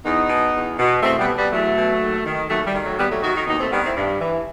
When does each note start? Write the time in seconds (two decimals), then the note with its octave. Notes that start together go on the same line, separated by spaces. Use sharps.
0.05 E2 B3 D#4
0.29 B2
0.54 E2
0.79 B2
1.03 E2 A3 C4
1.19 G3 B3
1.27 B2
1.36 G3 B3
1.52 E2 F#3 A3
1.76 B2
2.00 D#2
2.25 D#3
2.49 D#2 F#3 A3
2.66 G3
2.74 D#3
2.82 F#3 A3
2.98 D#2 G3 B3
3.10 F#3 A3
3.23 D#3 D#4 F#4
3.35 D#4 F#4
3.47 D#2 B3 D#4
3.59 A3 C4
3.71 D#3 G3 B3
3.83 C4 E4
3.96 G2
4.20 E3